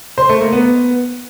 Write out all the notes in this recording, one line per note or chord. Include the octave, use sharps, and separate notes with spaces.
C5
A3
A#3
B3